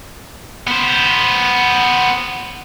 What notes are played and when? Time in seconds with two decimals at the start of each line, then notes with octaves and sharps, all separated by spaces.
0.68 B3 C5